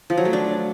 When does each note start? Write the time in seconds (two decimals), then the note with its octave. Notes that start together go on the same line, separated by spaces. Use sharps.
0.10 F3
0.18 F#3
0.25 A3
0.33 D4